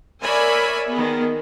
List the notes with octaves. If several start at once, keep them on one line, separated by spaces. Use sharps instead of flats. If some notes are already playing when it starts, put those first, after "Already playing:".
A#4 C#5 D5 E5 G#5 B5
D#3 B3 G#4